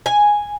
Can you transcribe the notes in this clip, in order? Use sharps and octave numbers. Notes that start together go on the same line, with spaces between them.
G#5